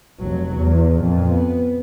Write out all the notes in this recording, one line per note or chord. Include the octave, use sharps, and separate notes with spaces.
F1 F#3
E2
F2 A#2
B3